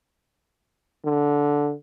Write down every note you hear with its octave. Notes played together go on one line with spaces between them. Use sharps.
D3